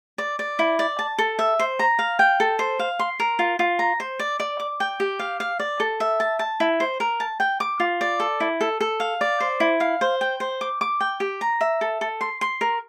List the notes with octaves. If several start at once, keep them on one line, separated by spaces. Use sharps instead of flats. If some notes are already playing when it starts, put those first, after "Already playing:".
D5
D5
E4
D5
A5
A4
E5
C5
A#5
F5
G5
A4
C5
F5
C6
A#4
F4
F4
A#5
C5
D5
D5
D6
G5
G4
F5
F5
D5
A4
E5
A5
A5
E4
C5
A#4
A5
G5
D6
F4
D5
A4
E4
A4
A4
F5
D5
C5
E4
F5
C5
G5
C5
D6
D6
G5
G4
A#5
E5
A4
A4
C6
C6
A#4